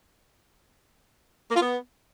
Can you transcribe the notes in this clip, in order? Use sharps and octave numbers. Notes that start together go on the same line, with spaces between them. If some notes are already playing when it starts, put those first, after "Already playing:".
A#3
F4
B3